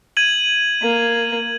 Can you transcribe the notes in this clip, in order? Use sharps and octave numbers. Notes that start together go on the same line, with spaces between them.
G#6 D#7 F#7
A#3